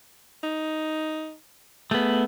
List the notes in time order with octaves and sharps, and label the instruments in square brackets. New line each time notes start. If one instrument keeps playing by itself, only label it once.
[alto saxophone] D#4
[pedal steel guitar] A3 B3 [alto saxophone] G#4